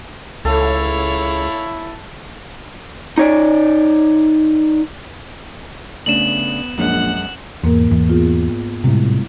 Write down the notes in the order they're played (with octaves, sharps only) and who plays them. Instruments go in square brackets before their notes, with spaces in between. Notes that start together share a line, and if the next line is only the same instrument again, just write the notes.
[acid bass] C#2 [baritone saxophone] E4 [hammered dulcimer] A4 [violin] C#5 F5
[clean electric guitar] D#4 C#5 D5
[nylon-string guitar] C#3 A3 D4 [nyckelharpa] B3 [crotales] E7 F#7
[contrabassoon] A#1 [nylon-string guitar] F#2 G#3 [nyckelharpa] F#5
[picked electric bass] E2 [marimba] G#2 A#3 A#4
[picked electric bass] E2
[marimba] B3 F4 G#4
[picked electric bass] A2 C3 [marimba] G3 G#3 E4